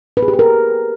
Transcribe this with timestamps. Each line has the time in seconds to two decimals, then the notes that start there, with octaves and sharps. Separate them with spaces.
0.17 B4
0.23 G#4
0.28 G4
0.34 B4
0.39 A#4